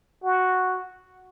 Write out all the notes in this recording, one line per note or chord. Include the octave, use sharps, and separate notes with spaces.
F#4